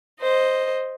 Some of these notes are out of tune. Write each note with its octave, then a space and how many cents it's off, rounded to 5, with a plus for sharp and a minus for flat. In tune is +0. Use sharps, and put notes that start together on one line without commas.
C5 +0 D#5 +0